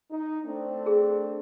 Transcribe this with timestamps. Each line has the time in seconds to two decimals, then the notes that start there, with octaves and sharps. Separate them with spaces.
0.11 D#4
0.45 A3 C4 D4
0.86 G#4